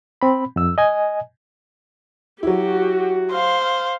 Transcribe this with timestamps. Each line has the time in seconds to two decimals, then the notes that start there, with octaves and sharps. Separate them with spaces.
0.22 C4 B5
0.56 F2 E6
0.78 D#5 G#5
2.43 F#3 E4 F#4 G4
3.33 C5 F5
3.64 F5